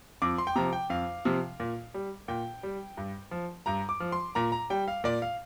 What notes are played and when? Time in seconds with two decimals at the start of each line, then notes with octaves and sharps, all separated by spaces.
0.22 F2 D6
0.38 C6
0.47 G5
0.56 C3 F3 A#5
0.73 G5
0.90 F2 F5
1.25 C3 F3
1.60 A#2
1.94 G3
2.28 A#2 G5
2.63 G3
2.97 G2
3.31 F3
3.66 G2 A#5
3.89 D6
4.00 F3
4.12 C6
4.35 A#2 A#5
4.52 A#5
4.70 G3 G5
4.88 F5
5.04 A#2 D5
5.22 F5